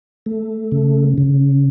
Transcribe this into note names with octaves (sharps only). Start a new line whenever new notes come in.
A3
C#3
C#3